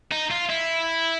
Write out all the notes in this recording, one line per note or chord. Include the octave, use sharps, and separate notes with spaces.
D#4
F4
E4